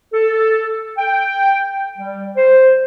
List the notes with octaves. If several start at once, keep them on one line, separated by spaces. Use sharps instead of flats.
A4
G5
G3
C5